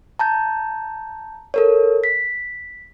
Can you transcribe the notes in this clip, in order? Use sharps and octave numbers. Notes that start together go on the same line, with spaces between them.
A5 A#5 G6
A4 A#4 C#5
B6